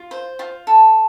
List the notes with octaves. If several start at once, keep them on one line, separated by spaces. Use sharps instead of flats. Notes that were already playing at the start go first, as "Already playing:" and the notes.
Already playing: F4
C5
F4
A4